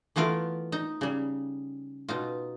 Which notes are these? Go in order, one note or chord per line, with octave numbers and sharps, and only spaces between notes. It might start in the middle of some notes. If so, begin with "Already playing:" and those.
E3 A3 B3 F4 A#4
D#4
C#3 G3
B2 D#4 F4